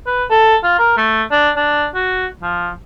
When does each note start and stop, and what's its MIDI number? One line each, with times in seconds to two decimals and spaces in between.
0.07 0.24 71
0.30 0.56 69
0.63 0.74 65
0.79 0.94 70
0.97 1.23 57
1.31 1.51 62
1.56 1.86 62
1.95 2.26 66
2.42 2.70 53